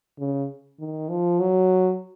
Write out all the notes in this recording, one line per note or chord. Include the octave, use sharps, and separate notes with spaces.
C#3
D#3
F3
F#3